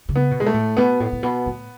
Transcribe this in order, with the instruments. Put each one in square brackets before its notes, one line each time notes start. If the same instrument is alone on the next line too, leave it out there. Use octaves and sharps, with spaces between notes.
[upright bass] C#3
[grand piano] B3
[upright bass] B2
[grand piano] G#3
A3
[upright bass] A2
[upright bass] B2 [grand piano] B3
[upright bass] A2
A2
B2
A2